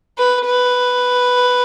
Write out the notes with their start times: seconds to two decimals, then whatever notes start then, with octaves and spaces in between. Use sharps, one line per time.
0.18 B4
0.46 B4